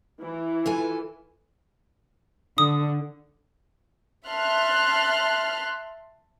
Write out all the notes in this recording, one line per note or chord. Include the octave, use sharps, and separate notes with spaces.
E3
F4 A4 G#5
D3 D#6
E5 A5 C6 F6 F#6